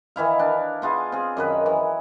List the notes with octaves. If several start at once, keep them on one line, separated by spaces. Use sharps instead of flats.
D#3 E3 E4 F5
D4
B3 F4 G#4
C4 G#4
F#2 D#3 B4
E3